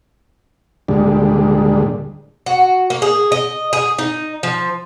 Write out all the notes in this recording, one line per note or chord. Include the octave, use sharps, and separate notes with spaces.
D2 A#2 D3 G3 G#3
F#4
A#3
G#4
D#5
G#4
D#4
F3